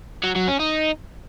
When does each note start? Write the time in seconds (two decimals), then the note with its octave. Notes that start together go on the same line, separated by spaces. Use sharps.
0.24 F#3
0.35 F#3
0.47 C#4
0.59 D#4